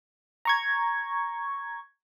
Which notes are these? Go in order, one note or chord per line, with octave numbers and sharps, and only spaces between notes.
A#5 C#6 G#6